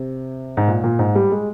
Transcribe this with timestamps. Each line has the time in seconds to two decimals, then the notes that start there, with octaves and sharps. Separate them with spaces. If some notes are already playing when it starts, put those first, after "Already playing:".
Already playing: C3
0.57 G#2
0.68 A#2
0.84 A#2
0.99 G#2
1.15 G3
1.32 G#3